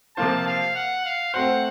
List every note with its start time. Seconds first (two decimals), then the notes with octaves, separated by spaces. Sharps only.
0.17 C3 F3 A#3 F4 C5 A5
0.47 F5
0.75 F#5
1.05 F5
1.33 A3 C4 F#4 C5 F#5